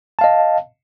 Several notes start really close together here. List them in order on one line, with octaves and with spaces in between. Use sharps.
A5 F5 D#5